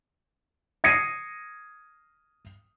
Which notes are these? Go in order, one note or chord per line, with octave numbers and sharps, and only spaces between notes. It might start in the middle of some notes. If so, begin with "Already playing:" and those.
D#6 G#6 A#6 C7 C#7 D#7